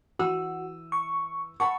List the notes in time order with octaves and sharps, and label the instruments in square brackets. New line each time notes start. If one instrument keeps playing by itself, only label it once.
[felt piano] E3 D#6 E6 [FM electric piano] F#4
[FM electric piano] C#6
[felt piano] F#5 A5 B5 [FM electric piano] C#6